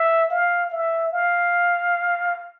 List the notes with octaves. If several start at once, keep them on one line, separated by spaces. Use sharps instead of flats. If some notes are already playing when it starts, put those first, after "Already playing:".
Already playing: E5
F5
E5
F5